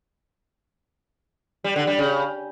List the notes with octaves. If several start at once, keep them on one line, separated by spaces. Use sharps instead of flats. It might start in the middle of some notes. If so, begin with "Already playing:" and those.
G3
D3
G3
C#3